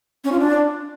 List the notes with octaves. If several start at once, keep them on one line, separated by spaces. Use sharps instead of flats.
C#4
F4
D4